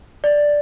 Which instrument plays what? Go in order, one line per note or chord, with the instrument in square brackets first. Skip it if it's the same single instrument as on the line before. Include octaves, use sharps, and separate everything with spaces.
[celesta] D5